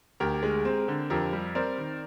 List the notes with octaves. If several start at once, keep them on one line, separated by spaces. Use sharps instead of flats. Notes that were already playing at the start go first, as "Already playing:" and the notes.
D2 G4 A#4
G#3
C4
D3
F2 G4 A#4
G3
C4 A#4 D5
D#3